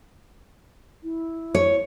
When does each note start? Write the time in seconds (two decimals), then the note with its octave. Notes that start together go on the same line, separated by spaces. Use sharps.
1.04 E4
1.54 C#5